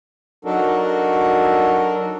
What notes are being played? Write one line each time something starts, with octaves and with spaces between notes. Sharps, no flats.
F#3 D4 D#4 F#4 A4 A#4